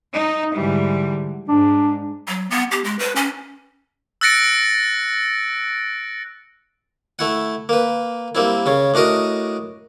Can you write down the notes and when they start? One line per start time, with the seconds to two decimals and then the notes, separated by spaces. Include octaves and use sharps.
0.12 D#4
0.55 G#2 D3 E3 G3
1.49 G#2 D4
2.28 F#3
2.50 B3
2.71 G4
2.84 G#3
2.99 B4
3.16 C#4
4.21 E6 F#6 A6 A#6 C#7 D7
7.19 A3 E4 F#5
7.69 A#3 B4
8.35 G3 A#3 C4 E4
8.66 C#3 C#4
8.94 A2 D4 F#4 A#4 D#5